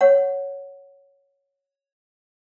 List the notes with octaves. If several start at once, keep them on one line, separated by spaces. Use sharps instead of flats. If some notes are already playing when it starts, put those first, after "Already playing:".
C#5 F#5